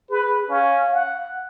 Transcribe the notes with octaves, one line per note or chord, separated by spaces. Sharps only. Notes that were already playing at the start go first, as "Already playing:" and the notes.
G#4 B4
C#4 F5
F#5